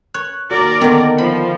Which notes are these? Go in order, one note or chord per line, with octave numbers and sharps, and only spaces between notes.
C#5 F#6
D#2 F#4 A#4 D5
D3 D#3 B3
F3 B5